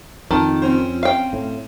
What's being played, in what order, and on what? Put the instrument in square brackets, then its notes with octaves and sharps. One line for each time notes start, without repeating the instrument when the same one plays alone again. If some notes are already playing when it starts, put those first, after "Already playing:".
[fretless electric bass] F2 [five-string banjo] D#3 [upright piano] A5
[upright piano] C4 C#4 C5
[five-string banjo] F5 G5
[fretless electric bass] A2